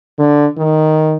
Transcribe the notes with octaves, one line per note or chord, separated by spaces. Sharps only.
D3
D#3